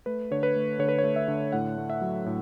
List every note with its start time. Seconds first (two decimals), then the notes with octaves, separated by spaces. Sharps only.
0.06 A3 B4
0.31 D3 C#5
0.43 B4
0.56 A3
0.79 D3 C#5
0.89 B4
0.98 C#5
1.04 A3
1.16 E5
1.28 D3
1.52 A2 F#5
1.78 A3
1.90 E5
2.02 F#3
2.26 A2